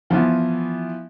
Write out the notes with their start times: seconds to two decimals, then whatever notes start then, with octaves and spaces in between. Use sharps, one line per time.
0.10 E3 F3 B3